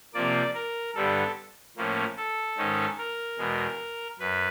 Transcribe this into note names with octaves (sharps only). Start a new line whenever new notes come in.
C3 F3 A#3 D5
A#4
G2 D3 G3 B3 A4
A2 F3 A#3 C#4
A4
G#2 D#3 G#3 C#4
A#4
E2 B2 G#3
F#2 B4